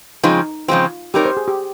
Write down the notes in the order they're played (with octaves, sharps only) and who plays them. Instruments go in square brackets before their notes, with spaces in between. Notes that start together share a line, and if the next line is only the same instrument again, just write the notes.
[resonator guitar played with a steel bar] C#3 F3 G#3 C4 [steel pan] D#4
[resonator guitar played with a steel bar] C#3 F3 G#3 C4 [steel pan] F4
[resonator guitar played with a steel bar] G3 C4 D#4 A#4 C#5 [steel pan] G4
[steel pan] C5
G#4
G4